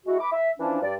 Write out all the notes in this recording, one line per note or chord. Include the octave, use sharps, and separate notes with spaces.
G#3 E4 F#4
B5 D6
E5
E3 F3 C#4 D4
G2 D5